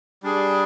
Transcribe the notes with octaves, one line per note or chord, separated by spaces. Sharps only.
G3 D4 G#4